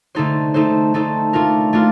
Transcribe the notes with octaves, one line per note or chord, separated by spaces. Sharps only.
D3 A3 D#4 A4 C5
A3 D#4 A4 C5
A3 D#4 A4 C5
A3 D4 F4 A#4
A3 D4 F4 A#4